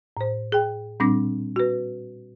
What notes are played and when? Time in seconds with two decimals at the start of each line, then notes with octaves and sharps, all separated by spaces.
0.17 A2 C5
0.52 G#4 G5
1.00 A#2 G3 C4 D4 D6 A#6
1.56 F#4 B4